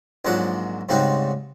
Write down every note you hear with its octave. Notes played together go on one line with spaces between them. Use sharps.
A#1 G#2 F#3 G#3 D5 F#5
G#2 C#3 G3 C4 D#4 F#4